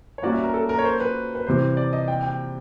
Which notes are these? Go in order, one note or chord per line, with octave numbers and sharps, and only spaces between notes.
C#5
G3 A#3 C#4 F#4 D5
E5
A#4
A4
A#4
C#5
C5
B4
B4
C3 E3 G3 C5
D5
D#5
G5
G5